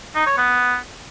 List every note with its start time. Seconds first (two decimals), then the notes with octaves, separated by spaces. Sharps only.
0.15 D#4
0.26 C#5
0.37 B3